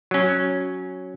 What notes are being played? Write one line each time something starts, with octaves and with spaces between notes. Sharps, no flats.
F#3 C#4